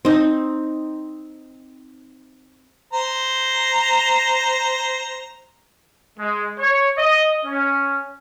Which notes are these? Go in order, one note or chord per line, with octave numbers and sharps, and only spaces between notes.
C4 D#4
C5 A#5
G#3
C#5
D#5
C#4